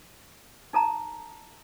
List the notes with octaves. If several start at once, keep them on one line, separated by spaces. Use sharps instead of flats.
D#4 A4 A5 A#5